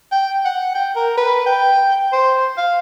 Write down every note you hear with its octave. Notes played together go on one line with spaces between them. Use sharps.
G5
F#5
G5
A#4
B4
G5
C5
F5